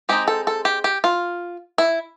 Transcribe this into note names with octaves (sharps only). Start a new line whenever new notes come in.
G#3 C4 D#4 G4
A4
A4
G4
G4
F4
E4